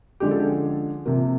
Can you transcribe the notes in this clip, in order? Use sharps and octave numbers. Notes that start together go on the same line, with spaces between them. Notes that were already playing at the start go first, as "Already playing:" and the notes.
D3 F3 G#3 C#4 G4
A4
C3 F3 A#3